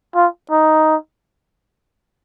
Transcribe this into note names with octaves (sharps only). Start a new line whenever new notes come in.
F4
D#4